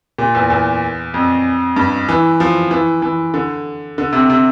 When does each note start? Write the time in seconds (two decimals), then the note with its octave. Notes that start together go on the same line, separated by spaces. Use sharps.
0.18 A#2
0.35 E2
0.50 E2
1.14 F2
1.76 G2
2.09 E3
2.40 F3
2.71 E3
3.02 E3
3.34 D3
3.98 D3
4.13 C3
4.30 C3